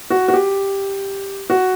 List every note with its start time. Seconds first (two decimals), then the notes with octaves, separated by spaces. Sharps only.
0.10 F#4
0.28 F#4
0.34 G4
1.50 F#4